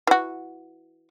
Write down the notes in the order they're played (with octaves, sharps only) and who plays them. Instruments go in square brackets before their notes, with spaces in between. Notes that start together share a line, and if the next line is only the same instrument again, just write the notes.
[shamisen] E3 F#4